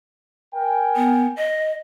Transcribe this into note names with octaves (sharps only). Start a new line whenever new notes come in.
A#4 G5 G#5
B3
D#5